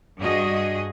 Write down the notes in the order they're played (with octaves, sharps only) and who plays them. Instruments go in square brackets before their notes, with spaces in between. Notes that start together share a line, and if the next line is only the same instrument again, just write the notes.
[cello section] G2 F#4 G#4 D#5